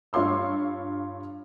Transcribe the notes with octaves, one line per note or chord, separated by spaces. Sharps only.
G2 F4 C#5 C6 E6